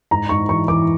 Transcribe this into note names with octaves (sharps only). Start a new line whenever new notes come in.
G#2 A#5
G#2 C#6
E3 C#6
E3 D6